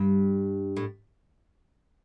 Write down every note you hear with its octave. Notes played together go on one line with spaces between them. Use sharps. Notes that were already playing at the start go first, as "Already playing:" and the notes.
Already playing: G2
A2